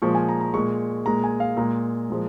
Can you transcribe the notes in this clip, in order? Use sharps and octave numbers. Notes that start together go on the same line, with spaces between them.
A#2 F3 G#3 C#6
G#5
A#5
A#5
A#2 G#3 C#6
A#2 G#3 A#5
G#5
F5
A#2 G#3 A#5
A#2 F3 G#3